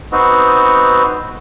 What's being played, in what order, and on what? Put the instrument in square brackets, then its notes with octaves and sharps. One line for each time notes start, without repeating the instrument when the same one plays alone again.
[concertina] B3 C4 D#4 F#4